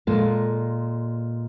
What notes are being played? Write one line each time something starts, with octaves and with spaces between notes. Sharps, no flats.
A#2 G#3 A4 F5